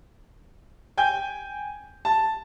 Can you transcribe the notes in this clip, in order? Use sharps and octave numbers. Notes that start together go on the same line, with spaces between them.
G5 G#5 G6
A5